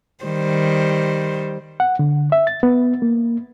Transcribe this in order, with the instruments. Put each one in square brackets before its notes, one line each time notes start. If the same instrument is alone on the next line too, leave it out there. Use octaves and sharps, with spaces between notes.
[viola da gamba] D#3 G3 C5
[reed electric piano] F#5
D3
E5
A6
B3
A#3